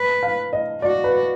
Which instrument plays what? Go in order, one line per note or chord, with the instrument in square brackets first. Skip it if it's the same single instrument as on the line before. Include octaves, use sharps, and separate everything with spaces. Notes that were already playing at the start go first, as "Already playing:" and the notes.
Already playing: [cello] B4
[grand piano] F5
D#5
[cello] F#4 [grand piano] D5
[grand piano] B4